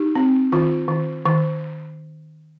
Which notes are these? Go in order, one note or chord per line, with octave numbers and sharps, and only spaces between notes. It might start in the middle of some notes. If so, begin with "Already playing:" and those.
Already playing: D#4 G4
C4
D#3 F4
D#3
D#3